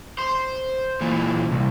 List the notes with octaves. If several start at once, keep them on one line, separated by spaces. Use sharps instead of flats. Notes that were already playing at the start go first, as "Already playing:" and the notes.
C5
A#2 E3
C2